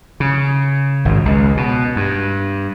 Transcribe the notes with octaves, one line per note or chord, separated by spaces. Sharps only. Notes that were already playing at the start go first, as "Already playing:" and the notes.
C#3
G#1
C#2
B2
G2